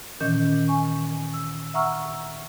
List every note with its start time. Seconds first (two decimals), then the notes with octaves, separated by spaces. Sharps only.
0.20 A#2 D#3 E3 C#4 D#5 G6
0.68 G#5 C#6
1.33 E6
1.74 E5 F#5 A#5 C#6 E6 F6